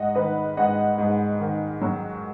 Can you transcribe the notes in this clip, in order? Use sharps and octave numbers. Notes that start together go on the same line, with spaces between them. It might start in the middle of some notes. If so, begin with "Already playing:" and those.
Already playing: G#2 D#5 F#5
D#3 B4 D#5
G#2 D#5 F#5
G#2
D#3
F#3